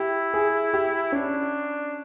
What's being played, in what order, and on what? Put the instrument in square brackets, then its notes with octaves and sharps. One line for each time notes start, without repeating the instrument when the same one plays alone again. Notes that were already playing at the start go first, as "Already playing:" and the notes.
Already playing: [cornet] E4 [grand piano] G4
[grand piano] G#4
G4
[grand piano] C#4 [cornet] D4